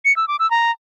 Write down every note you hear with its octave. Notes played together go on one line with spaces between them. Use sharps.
C#7
E6
D6
E6
A#5